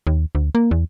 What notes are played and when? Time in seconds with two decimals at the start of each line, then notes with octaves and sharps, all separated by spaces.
0.07 D#2
0.35 D2
0.55 A#3
0.71 E2